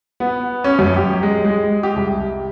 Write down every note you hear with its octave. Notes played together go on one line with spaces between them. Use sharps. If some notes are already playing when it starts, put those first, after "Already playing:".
B3
C#4
F#2
G4
G#3
G#3
G4
C2